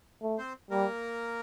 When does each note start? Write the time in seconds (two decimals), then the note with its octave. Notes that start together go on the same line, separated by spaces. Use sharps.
0.22 A3
0.38 C4 C5
0.70 G3 A#3 A#4